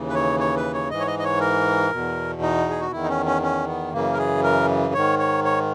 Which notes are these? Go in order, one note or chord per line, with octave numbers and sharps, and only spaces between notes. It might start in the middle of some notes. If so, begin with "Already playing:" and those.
Already playing: D#2 C#3 E3
B4
C#5
C#5
B4
C#5
G#2 E3 D#5
C#5
D#5
D#5
C#5
A#4
E2 B2
D#4
G#4
F#4
E2 D#3 E4
D#4
C#4
C#4
C#4
B3
F#2 C#3 E3 A#3
A#4
G#4
A#4
G#2 D#3 C#5
C#5
C#5